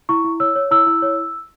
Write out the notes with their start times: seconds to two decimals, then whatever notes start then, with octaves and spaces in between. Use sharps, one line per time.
0.09 E4 C#6
0.24 E4
0.40 C#5 E6
0.56 C#5
0.71 E4 E6
0.86 E4
1.02 C#5